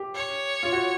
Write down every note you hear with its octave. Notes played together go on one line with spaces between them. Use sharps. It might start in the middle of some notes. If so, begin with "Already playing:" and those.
Already playing: G4
C#5
F4
F#4